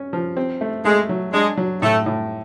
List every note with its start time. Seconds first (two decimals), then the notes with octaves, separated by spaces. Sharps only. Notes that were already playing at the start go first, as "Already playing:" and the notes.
Already playing: C#4
0.13 F3
0.37 C4
0.61 A3
0.85 G#3 A3
1.09 F#3
1.33 G#3 D4
1.57 F#3
1.82 A2 A3
2.06 A2